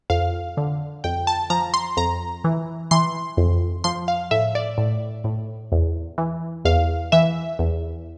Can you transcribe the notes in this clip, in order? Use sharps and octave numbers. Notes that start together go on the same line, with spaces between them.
F2 F5
D3
F2 G5
A5
F3 A#5
C6
F2 A#5
E3
E3 C6
F2
F3 C6
F5
A2 E5
D5
A2
A2
E2
E3
E2 F5
E3 E5
E2